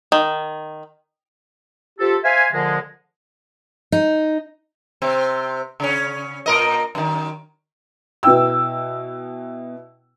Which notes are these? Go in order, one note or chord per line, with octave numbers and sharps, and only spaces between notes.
D#3
F3 F4 G4 A4
C5 E5 F5 G#5
A#2 D3 F3 G#3
D#4
C3 C4
C#3 C#4
A#2 A#4 D#5
F#2 D#3
B2 B3 E4 G5 E6